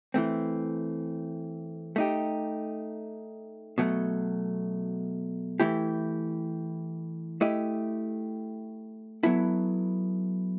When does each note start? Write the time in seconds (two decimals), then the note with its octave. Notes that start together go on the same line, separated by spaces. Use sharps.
0.14 E3 A3 C4
1.96 A3 D#4 G4
3.78 B2 F#3 A3
5.60 E3 A3 E4 G4
7.41 A3 E4 G4 D#5
9.23 F#3 B3 E4 A4